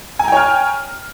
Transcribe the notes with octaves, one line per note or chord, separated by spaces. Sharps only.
C#5 G5 G#5 A#5 F6